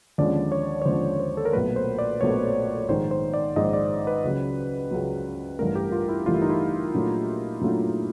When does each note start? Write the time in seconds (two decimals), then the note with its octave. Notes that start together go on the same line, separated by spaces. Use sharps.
0.18 D#2 D3 F3 G#3 C#4 D5
0.52 C#5
0.82 C#5
0.86 D#2 D3 F3 G#3 C#4 C5
1.20 C5
1.37 A4
1.45 A#4
1.53 B1 A#2 F#3 A3 B4
1.76 C5
1.99 D5
2.21 B1 A#2 F#3 A3 C#5
2.88 A#1 G#2 D#3 C5
3.11 C5
3.34 D5
3.56 A#1 G#2 D#3 D#5
3.73 D5
4.07 B4
4.24 C#2 C#3 F#3
4.91 C#2 C#3 F#3
5.58 A1 G2 E3 A3 A#4
5.75 G4
5.92 F4
6.09 E4
6.26 A1 G2 E3 A3 F4
6.34 E4
6.42 D#4
6.50 E4
6.94 A#2 F#3 A3 D4 F4
7.61 A#2 F#3 A3 D4 F4